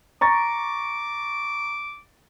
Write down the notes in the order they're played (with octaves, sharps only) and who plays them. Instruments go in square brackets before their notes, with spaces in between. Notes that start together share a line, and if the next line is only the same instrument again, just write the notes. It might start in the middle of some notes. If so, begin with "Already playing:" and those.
[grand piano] A#5 C#6 A6 [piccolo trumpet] D6